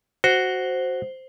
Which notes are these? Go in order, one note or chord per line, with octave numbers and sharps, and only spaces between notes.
F#4 C5